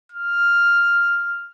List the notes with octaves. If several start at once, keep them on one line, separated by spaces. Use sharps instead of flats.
F6